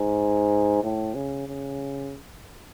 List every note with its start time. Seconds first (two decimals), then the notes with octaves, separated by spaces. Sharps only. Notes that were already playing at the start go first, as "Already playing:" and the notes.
Already playing: G#2
0.83 A2
1.15 C#3
1.48 C#3